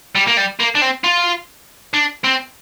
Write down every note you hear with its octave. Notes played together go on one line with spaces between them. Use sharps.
G3
A#3
G3
A#3
D4
C4
F4
D4
C4